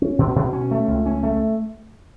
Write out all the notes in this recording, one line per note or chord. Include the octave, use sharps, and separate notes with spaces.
C#4
B2
B2
C#4
A3
C#2
C#4
A3